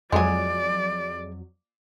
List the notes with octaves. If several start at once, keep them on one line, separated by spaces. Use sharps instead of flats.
F2 F#3 G#3 D5 G#5